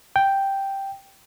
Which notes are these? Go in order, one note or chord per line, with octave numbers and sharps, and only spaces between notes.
G5